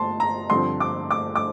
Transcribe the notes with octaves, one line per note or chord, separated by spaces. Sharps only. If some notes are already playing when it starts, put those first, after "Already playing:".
Already playing: G1 A3 A5 C6
A#5
G2 D3 F3 C4 C6
D6
D6
D6